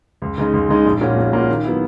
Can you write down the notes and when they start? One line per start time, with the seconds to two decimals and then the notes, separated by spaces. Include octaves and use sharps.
0.22 C#2
0.38 C#3 G#3 D#4
0.53 C#2
0.69 C#3 G#3 D#4
0.85 A#1
1.01 A#2 A#3 C#4 F#4
1.16 A#1
1.33 A#2 A#3 C#4 F#4
1.48 D#3
1.64 F#3 B3 E4